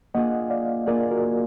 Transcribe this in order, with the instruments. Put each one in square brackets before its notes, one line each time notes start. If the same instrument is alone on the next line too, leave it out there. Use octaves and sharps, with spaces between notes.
[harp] A#3 D4 F4 G#4 [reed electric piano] D#5 F#5
[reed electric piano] D5 F5
[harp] A#3 D4 F4 G#4 [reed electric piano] A#4 D5
[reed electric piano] F#4 A#4